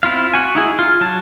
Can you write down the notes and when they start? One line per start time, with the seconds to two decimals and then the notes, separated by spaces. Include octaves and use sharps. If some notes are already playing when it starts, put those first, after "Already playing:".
0.03 C4 E4 F4 F5
0.34 F#4 G#5
0.55 D#4 E4 G#4
0.79 F4
1.01 F#3 A5